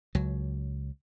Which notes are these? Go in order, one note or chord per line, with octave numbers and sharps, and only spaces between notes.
C#2 F#3